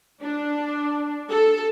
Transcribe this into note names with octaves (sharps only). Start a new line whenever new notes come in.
D4
A4